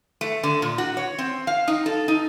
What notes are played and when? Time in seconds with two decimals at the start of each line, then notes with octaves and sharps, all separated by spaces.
0.21 A3
0.43 D3
0.62 A#2
0.78 F#4
0.97 C#5
1.18 C4
1.47 F5
1.68 D#4
1.86 A4
2.08 D#4